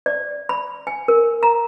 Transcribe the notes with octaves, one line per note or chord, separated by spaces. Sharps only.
D5
B5
G#5
A#4
A#5